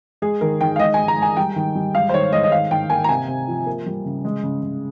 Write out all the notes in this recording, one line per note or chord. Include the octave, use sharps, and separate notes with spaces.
G#3 G#4
D#3 A#4
D#3 G5
F5
G#3 D#5
G#3 G#5
A#5
G#3 G#5
G3 G5
D#3
G3
G#3 F5
C5
D#3 C#5
G#3 D#5
D#5
D#3 F5
D#3 G5
A#3 G#5
A#5
C3 G#5
C3
F3
A#3
G3
C#3
G#3
C#3
C#3